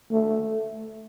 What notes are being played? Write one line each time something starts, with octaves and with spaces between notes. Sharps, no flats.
A3